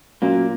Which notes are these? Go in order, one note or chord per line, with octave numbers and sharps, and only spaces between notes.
F#2 A#2 A#3